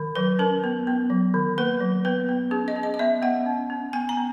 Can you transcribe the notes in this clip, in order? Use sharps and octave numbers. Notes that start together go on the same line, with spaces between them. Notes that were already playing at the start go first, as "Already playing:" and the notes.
Already playing: D#3
F#3 B4
C#4 A#4
B3
B3
F#3
D#3
A#3 B4
F#3
B3 B4
B3
C#4 G#4
D#5
C#4
D#5
D#5
B3 E5
B3 F#5
C#4
C#4
B3 G#5
A#5
B3